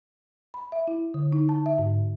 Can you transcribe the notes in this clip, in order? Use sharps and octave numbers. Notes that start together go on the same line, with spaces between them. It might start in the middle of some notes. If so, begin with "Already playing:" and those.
B5
E5
E4
D3
D#4
A5
E5
G#2